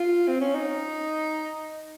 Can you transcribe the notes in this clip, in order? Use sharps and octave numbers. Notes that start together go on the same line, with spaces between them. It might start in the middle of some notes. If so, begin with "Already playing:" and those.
Already playing: F4
C4
C#4
D#4